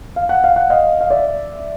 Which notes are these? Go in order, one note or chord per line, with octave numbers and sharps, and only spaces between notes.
F5
F#5
F5
F#5
D#5 F5
F5
D5 E5